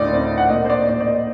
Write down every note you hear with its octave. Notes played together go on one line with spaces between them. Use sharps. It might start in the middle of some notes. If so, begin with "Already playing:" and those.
Already playing: D2 A2 D5 D#5
C4
F#5
A#2 D#5
C5
D5
A#2 D5
D5
D#5